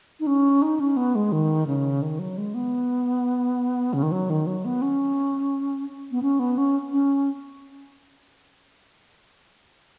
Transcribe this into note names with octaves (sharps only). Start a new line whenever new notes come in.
D#4
C#4
D#4
C#4
B3
G#3
D#3
C#3
D#3
F#3
G#3
B3
C#3
D#3
F#3
D#3
F#3
B3
C#4
B3
C#4
B3
C#4
C#4